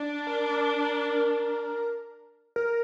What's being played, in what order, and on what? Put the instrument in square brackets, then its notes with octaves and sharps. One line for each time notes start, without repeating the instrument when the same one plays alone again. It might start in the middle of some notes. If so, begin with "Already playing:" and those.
Already playing: [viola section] D4
[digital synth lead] A#4
A#4